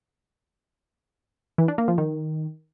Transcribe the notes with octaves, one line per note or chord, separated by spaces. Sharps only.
E3
D4
A#3
F3
D#3